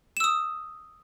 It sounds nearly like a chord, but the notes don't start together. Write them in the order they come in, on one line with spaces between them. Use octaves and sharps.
E7 E6 D#6